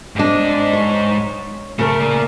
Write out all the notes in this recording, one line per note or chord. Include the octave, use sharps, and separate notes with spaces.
G#2 C3 D4 D#5
C#5
C#3 A3 A#4
A#3 D5